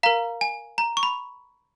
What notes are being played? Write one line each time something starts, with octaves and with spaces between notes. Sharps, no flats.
A#4 F5 A#5
G#5
A#5
C#6
B5